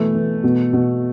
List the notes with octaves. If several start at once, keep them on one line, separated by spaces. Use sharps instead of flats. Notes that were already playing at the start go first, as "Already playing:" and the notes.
Already playing: B2 E3 A3
E3
B2
B2